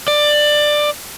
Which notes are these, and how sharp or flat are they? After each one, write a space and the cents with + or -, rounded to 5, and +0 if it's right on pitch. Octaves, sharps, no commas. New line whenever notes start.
D5 +15